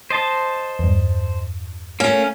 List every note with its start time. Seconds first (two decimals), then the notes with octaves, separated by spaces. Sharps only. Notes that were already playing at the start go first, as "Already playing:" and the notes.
0.10 C5 D#5 A5
0.79 E2 G2
2.00 A3 A#3 C#4